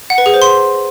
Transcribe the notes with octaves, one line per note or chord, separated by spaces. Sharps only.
F#5
B4
G#4
C5
C6